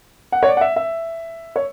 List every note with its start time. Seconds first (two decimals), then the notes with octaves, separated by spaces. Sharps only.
0.32 F#5
0.43 C#5
0.47 D5
0.57 F#5
0.61 E5
0.76 E5
1.56 C#5